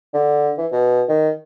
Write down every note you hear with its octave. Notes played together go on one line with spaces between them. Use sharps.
D3
E3
B2
D#3